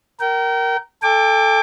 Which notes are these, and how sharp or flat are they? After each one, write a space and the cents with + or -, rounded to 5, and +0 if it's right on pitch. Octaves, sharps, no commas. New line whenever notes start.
A#4 +0 G5 -35
A4 +0 G5 +40 D6 +0